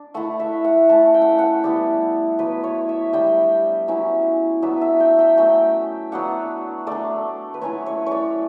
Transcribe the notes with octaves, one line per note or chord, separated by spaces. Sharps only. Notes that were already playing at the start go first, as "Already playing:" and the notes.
Already playing: D4
A3 E4 F#5
E5
F#5
A3 C#4 E4 A5
G5
F#5
G5
F#5
G3 B3 E4 D5
F#3 B3 E4 B4
C#5
E5
G3 D4 G5
F#3 C#4 E4
F#3 B3 D4 E5
E5
G5
G5
F#3 A3 C#4 G5
F#3 B3 D4 F#5
A3 D4 D5
B4
F#3 C#4 E4 C#5
C#5
C#5 D5